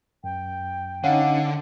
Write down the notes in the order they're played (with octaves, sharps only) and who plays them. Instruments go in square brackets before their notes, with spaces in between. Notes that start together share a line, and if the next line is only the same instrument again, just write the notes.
[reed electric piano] F#2 [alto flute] G5
[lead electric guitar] D3 [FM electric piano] C#4 D#4 [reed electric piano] F5 F#5